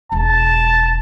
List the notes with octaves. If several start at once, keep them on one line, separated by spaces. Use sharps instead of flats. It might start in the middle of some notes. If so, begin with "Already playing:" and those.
E1 G#3 A5